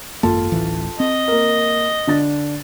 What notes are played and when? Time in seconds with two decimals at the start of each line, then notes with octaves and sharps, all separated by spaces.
0.23 G#1 F#2 A#3 F4 A4 A5
0.52 D1 A1 E3
1.00 C4 D#5
1.28 A#3 A#4
2.07 D3 D4 A6